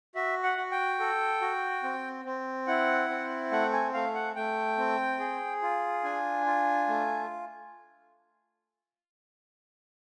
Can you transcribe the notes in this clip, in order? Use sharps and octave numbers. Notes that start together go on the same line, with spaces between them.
F#4 E5
F#5
F#4
G5
A4
F#4
C4
C4
E4 F#5
C4
A3 F#5
G#5
A3 F5
F#5
A3 G5
C4
G#4
F4
D4 G#5
F4
A3